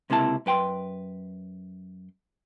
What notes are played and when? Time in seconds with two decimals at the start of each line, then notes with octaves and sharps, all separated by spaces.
0.10 C#2 C3 A#3 E4 A5
0.46 F#2 B4 G5 C6